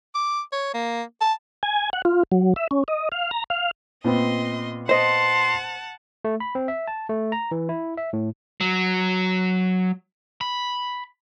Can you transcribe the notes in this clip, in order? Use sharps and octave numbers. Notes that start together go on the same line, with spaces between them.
D6
C#5
A#3
A5
G#5
F#5
F4
F#3
E5
C#4
D#5
F5
A#5
F5
A#2 B3 C4 D#5 C6
C5 D#5 F#5 A5 C6
A3
B5
C4
E5
A5
A3
A#5
E3
E4
E5
A2
F#3
B5